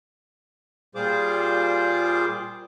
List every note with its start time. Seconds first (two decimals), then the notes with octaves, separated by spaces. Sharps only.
0.95 A#2 G3 F4 G#4 C5 D6